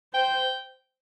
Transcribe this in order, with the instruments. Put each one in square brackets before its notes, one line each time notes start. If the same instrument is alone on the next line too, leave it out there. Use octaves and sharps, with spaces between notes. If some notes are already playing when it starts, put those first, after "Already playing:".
[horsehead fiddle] C5 [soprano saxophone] G5